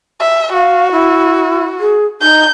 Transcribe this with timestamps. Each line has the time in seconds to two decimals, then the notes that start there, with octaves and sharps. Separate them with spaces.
0.20 E5
0.53 F#4 F5
0.92 E4
1.80 G#4
2.21 D#4 G6